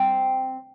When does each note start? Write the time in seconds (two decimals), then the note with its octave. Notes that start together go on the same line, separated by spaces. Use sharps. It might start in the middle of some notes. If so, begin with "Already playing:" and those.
Already playing: C4